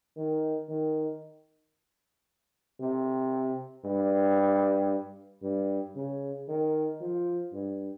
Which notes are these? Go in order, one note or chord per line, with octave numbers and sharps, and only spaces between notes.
D#3
D#3
C3
G2
G2
C#3
D#3
F3
G2